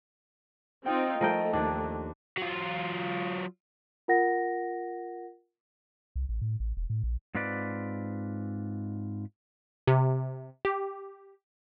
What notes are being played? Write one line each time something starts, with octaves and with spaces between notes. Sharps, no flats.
C4 D#4 F4 D#5 G5
F3 A3 A#4 D#5 G5
D#2 D4
F#3 F4
F4 A#4 F#5 A#6
C2
A1
A2
A1
E1
A2
A#1
G#2 C4 F4 B4 D5
C3
G4